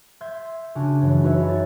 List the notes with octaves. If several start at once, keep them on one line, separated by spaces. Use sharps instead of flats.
E5 C6 G6 G#6
C#3 C#4 D4 F#4
F#2 E3
D#4 F#4 B4 C#5 E5
G#6 A6